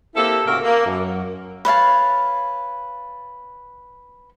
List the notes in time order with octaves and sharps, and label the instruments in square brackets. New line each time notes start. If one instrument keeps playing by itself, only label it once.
[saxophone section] A#3 C4 E4 G4 A4
D2 A2 C#3 A#3 F#4 A#4
A#3
F#2
[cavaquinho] B4 C#5 F5 A5